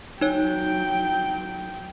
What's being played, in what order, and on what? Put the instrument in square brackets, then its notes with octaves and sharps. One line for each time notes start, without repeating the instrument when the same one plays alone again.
[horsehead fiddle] F#3 G5 [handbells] D#4 C#5